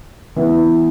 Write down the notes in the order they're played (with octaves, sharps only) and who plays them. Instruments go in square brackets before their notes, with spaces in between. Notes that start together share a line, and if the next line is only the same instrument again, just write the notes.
[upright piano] E3 B3